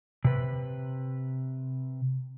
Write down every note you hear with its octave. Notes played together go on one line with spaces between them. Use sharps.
C3 B4